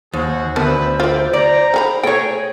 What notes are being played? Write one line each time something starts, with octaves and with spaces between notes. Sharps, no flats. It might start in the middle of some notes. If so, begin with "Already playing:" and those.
D#2 F#4 G#4 C5
D2 B3 A#4 B4 E5 A5
F4 A#4 B4 D5 E5
D5 A#5
D#3 G#4 B5
A3 G#4 C#5 G5